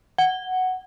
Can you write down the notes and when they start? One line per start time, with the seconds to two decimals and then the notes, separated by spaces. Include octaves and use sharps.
0.18 F#5